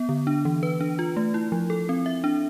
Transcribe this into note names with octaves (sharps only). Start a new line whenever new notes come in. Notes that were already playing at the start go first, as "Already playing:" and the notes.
Already playing: B3
D3
D4
E3
B4
D4
F4
A3
E4
F3
A4
C4
E5
D4